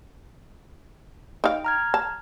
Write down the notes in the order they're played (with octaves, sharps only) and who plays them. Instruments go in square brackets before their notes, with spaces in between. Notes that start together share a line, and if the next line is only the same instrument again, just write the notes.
[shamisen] D#4 F5 [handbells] G5
[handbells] A#5 F6 G#6
[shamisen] A5